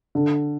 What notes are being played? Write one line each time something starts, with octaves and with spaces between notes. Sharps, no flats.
D3